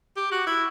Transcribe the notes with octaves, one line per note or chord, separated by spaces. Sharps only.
G4
F#4
E4